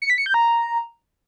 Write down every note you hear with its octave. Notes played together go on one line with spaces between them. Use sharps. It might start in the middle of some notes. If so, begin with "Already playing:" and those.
C#7
B6
C#7
G6
A#5